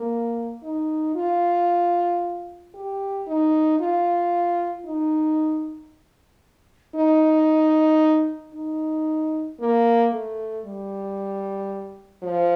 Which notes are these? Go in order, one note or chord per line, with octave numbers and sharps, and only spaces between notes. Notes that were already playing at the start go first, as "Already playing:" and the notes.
Already playing: A#3
D#4
F4
G4
D#4
F4
D#4
D#4
D#4
A#3
A3
G3
F3